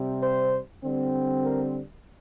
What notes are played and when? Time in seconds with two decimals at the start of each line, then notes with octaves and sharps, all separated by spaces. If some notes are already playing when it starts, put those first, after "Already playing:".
Already playing: C3 G3 C4
0.23 C5
0.83 D3 G3 C4
1.44 A#4